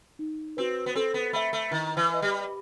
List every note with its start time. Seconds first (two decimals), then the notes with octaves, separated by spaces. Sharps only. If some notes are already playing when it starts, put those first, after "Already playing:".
0.19 D#4
0.57 C4 F#4 B4
0.86 B3
0.95 C4 A4
1.14 B3
1.33 A3 E5 G5 B5
1.53 A3
1.71 D#3 E4
1.97 E3
2.10 B4 D#5
2.22 G3